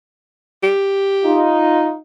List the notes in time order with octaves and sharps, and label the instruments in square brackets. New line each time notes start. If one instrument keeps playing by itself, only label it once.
[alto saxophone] G4
[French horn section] D#4 F4